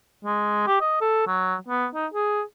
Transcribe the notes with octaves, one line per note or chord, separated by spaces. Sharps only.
G#3
G4
D#5
A4
F#3
B3
D#4
G#4